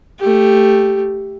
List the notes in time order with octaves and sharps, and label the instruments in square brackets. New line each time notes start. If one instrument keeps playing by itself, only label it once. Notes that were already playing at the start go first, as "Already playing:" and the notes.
[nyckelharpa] A3 G4